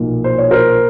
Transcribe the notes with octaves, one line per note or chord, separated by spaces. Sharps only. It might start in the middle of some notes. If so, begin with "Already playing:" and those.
Already playing: B1 A#2 F3 A#3 D#4
C5
C#5
A#4 C5